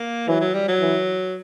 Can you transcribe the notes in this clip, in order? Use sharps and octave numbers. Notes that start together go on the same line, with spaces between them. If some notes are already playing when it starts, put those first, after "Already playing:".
Already playing: A#3
E3 F#3
F#3
G3
F#3
E3